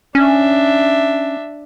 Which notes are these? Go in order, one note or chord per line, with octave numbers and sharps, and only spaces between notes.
C#4 D4 E5